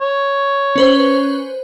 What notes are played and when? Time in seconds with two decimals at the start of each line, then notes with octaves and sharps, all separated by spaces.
0.01 C#5
0.76 C#4 B4 C5